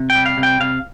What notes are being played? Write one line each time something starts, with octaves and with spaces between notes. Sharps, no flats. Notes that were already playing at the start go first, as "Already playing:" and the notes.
Already playing: C3
G5
G3
F5
C3
G5
C3 F5